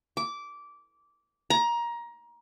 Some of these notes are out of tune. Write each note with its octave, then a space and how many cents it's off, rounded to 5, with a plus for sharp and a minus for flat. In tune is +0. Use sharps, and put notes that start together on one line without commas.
D6 -15
A#5 +20